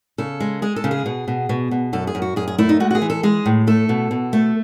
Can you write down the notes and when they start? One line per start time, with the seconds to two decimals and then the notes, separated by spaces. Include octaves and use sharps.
0.18 C#3 A4
0.40 G#3
0.62 G#3 G#4
0.76 A4
0.84 C#3
0.91 G#4
1.06 B2
1.28 B2
1.49 B2
1.71 B2
1.93 F#2 A4
2.07 G#4
2.15 F#2
2.22 F#4
2.36 F#2 G#4
2.48 G#4
2.58 A3 E4
2.69 D#4
2.80 G#3 F#4
2.91 F#4
2.95 G#4
3.02 E3
3.10 A4
3.23 G#3 G#4
3.46 A2
3.67 A3 A4
3.89 B2
4.11 B2
4.33 A3